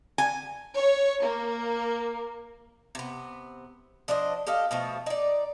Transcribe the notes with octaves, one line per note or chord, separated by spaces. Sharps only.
G#5
C#5
A#3
C3 B3
F3 D4 C5 D#5
G4 A4 D#5 F5
B2 F3 A3
D#4 D5